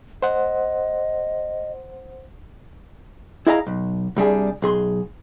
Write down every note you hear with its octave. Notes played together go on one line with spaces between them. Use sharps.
C5 D#5 F#5
E4 G#4 D#5 F5 G5 A#5
B1
C2 G3 D4 G#4
B1 G#4 C6